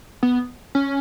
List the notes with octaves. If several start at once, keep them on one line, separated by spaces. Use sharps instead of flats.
B3
C#4